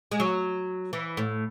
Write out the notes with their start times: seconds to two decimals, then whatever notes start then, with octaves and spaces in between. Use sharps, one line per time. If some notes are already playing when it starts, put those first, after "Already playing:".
0.12 G#3
0.20 F#3
0.93 E3
1.17 A2